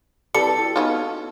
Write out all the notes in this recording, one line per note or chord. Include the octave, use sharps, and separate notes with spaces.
G3 C4 E4 A4 B4 C#7
E4 F#4
B3 C#4 D#4 F4 D#5